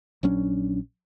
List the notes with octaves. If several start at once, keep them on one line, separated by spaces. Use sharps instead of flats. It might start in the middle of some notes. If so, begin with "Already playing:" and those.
A#1 F#3 C#4 D4